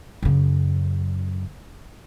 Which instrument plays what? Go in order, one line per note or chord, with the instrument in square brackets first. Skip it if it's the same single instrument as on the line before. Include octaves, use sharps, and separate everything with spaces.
[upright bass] F#2 C#3